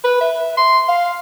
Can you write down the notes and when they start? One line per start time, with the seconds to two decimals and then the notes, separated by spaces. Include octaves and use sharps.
0.04 B4
0.21 E5
0.57 C6
0.89 F5